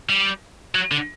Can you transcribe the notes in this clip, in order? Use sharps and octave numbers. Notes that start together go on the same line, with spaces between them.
G3
F#3
D3